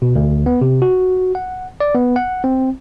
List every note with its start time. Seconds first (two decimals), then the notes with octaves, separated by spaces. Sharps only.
0.02 B2
0.15 D2
0.46 B3
0.61 C3
0.82 F#4
1.35 F#5
1.80 D5
1.95 B3
2.16 F#5
2.44 C4